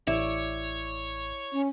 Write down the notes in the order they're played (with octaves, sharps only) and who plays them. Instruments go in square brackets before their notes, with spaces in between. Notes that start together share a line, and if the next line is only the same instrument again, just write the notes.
[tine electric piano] A1 [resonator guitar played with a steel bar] E4 D5 [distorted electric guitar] C#5
[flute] C#4